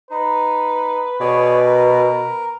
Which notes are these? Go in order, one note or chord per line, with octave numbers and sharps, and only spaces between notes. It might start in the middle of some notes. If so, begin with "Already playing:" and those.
D#4 B4
B2 G#4 C#5 D5
A#4